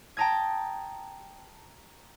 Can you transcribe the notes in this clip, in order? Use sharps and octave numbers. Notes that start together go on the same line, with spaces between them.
G5 A5 A#5 D#6 G#6